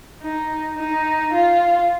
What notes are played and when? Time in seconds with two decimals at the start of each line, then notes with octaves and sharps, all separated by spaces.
0.22 D#4
0.78 D#4
1.33 F4